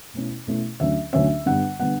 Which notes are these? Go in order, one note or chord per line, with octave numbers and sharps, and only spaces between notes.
B2 A3 C#4 E4
B2 A3 C#4 E4
D2 D3 F#3 C#4 E5
D2 D3 F#3 C#4 E5
G2 D3 G3 B3 F#5
D3 G3 B3 F#5